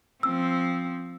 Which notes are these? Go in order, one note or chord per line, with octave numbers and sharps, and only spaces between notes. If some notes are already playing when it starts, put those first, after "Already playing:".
F3 C4 E6